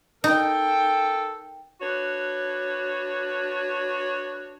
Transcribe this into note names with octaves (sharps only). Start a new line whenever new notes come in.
D#4 A4 A#4 G5
D4 F#4 B4 C#5